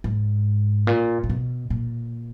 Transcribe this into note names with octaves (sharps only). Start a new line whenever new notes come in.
G#2
A#2
A#2
B2
A#2